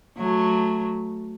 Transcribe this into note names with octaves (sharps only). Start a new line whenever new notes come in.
F#3 A3